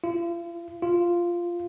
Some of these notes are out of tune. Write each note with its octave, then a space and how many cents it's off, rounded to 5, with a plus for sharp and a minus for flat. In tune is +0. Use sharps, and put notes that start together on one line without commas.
F4 -40
F4 -5